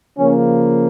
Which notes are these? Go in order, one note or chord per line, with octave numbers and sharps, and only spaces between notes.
C#3 F3 A#3 C#4